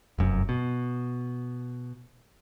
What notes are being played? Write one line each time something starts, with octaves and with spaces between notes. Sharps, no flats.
F1 F#2
B2